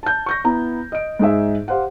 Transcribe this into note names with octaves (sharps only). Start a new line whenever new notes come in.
A5 G6
C#6 G6 A#6
B3 E4 A#5
D#5 D7
G#2 D#4 G#4 E5
G4 C5 F5 F#5